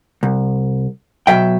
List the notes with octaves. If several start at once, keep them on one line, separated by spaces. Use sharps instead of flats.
C2
B2 F3 F#3 E5 G5